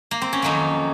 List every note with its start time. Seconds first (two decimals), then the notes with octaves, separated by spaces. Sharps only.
0.11 A#3
0.22 C4
0.33 C#4
0.42 F2 D#3 F#3 A#3 D#4